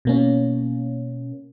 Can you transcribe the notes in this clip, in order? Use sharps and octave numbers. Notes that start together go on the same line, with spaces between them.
B2 A#3 C#4